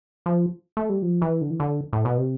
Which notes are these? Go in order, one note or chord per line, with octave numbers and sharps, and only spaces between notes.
F3
A3
G3
F3
E3
D3
E3
D3
A2
B2
C3